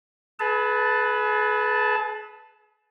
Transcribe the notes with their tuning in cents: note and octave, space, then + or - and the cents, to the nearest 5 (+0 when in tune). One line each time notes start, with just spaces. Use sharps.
G#4 +40 B4 +0 A5 +0